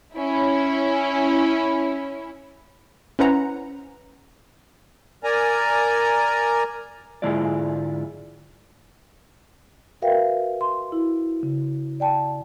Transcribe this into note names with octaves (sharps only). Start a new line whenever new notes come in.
C#4 E4
C#4 E4 B4 C5 F#5 A#5
A#4 D5 G#5 A#5
G#2 D3 G#3 E4 F4 D5
F#4 A#4 B4 E5 F5 G5
C6
E4 F#4
C#3
D5 G5 A5